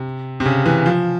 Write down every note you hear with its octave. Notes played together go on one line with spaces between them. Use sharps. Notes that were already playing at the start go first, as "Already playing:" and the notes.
Already playing: C3
C3
C#3
E3
F3